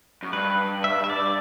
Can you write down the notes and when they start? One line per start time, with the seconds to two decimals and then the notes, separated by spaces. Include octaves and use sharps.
0.23 F#2
0.33 G2 B4
0.84 E5
1.04 E5
1.10 D5